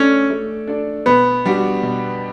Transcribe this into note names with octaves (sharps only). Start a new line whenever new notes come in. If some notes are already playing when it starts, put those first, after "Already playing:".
Already playing: A3 C#4 D4 A4 D5
A3
D4 A4 D5
B2 B3
G3 D4 F#4
B2